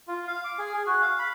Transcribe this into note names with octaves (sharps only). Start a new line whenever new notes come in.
F4
F5
D6
G#4
G#4
F#4
F5
B5